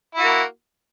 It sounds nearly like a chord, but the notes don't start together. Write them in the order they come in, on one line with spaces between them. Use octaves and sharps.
E4 F#4 A#3